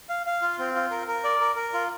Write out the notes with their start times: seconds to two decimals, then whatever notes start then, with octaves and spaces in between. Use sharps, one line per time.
0.09 F5
0.26 F5
0.42 F4
0.59 C4
0.76 F4
0.91 A#4
1.08 A#4
1.24 D5
1.40 A#4
1.56 A#4
1.73 F4